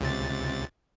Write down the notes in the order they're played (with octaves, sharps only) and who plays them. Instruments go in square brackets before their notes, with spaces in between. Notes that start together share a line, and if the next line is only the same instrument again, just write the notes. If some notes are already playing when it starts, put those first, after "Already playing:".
[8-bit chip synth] C#2 C3 A6